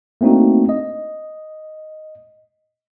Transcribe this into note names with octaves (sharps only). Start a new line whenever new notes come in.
A3 A#3 C4 D4 D#4 F#4
D#5